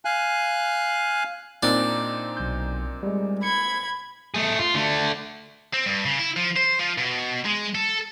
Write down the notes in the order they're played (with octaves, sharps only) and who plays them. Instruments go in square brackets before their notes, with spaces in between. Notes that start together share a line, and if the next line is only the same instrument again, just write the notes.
[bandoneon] F5 G#5 F#6
[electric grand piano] A#2 C4 D#4 [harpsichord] D4
[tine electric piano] B1 G6
G3 G#3
[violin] B5 G#6 [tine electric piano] C#7
[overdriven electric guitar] A3 G#4
F4
D3 A3
[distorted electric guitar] C4
G2
C#3
E4
F3
C5
F3
B2
G#3
A4